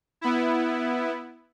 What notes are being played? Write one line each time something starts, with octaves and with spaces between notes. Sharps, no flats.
B3 E4